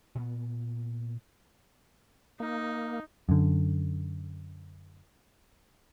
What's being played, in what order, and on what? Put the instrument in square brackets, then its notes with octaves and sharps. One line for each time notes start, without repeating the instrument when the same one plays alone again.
[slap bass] A#2 B3
[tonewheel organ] A#3 [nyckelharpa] D#4
[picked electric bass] F#2 D3